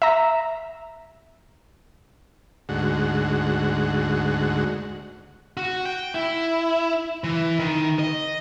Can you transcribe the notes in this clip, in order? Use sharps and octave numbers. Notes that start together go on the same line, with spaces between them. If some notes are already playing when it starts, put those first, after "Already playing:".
E5 A#5
D2 G#2 F#4
F#4
G5
E4
E3
D#3
D#5